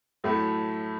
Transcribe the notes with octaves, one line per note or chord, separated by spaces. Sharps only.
A2 F#3 A3